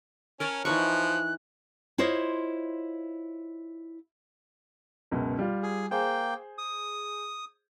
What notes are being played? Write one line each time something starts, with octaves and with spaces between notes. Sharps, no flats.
C#4 A#4 C#5 A5
E3 F3 D#4 C#6 F#6
E4 F4 C5 C#5 D#5
C#2 F#2 B2
G3 F4
G#4
A#3 G#4 C5 G5 G#5
D#6